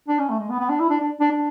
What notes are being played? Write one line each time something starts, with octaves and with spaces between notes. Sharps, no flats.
D4
C#4
A3
G#3
B3
B3
D4
E4
D4
D4
D4
D4